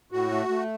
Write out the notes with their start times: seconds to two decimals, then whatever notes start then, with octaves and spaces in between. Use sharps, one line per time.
0.12 A2 F#4
0.31 A3
0.49 A3